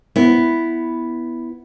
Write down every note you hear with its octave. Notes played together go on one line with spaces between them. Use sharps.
B3 E4